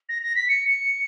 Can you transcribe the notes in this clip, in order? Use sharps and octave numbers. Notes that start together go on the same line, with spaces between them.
A#6
A#6
B6
C#7
C#7